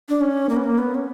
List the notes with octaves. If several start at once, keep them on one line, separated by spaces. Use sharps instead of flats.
D4
C#4
A#3
B3
A#3
B3
C#4